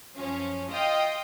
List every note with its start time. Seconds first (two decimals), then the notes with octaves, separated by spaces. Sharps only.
0.17 F#2 F3 C#4
0.70 F4 D#5 F5 G5 D#6